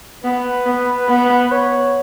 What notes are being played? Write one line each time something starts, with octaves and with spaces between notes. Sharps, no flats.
B3 B4
B3
B3
C#5